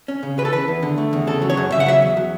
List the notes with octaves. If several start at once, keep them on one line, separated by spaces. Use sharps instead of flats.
C#4
C#3
C#3 B4
A4
E3 B4
E2
D3
A3
E2
C#3 A4
F#3
C#5
F#2
C#3 E5
F#5
F#3 E5
E2
F#3